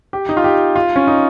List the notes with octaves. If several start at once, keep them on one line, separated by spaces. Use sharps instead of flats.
G4
D#4
F4
G4
F4
C#4
D#4